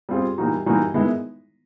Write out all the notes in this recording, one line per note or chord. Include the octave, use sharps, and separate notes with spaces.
G3 C4 F4 G#4
E3 G3 A#3 D#4 F#4
E3 G3 A#3 D#4 F#4
D#3 G#3 B3 E4